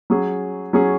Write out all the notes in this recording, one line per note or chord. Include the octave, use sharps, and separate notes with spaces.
F#3 C#4 G#4
F#3 C#4 G#4